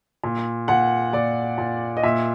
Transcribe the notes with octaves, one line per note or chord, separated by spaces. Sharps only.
A#2
A#2 F#5
A#2 D5
A#2
D#5
A#2 E5